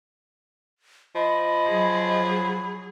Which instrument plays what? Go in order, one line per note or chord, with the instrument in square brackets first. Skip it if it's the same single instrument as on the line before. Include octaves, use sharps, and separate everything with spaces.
[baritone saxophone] F3 [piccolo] D#5 [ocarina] B5
[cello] F#3 G#4